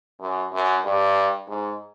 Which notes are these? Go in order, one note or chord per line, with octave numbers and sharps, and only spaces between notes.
F#2
F#2
G2
G#2